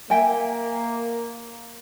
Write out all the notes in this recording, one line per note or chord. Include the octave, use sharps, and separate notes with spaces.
A#3 E5 G5 G#5